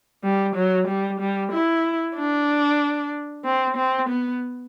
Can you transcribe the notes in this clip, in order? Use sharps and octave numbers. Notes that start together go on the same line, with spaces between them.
G3
F#3
G3
G3
E4
D4
C4
C4
B3